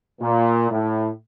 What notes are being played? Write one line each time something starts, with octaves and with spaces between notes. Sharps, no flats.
A#2
A2